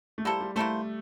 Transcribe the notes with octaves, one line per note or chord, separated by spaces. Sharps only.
A3
G3 A#3 E4 A4 C5
G3
A3 A#3 E4 A4 C5